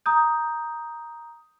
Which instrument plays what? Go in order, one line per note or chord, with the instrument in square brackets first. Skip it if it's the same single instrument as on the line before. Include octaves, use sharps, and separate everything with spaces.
[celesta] A#5 D#6 G6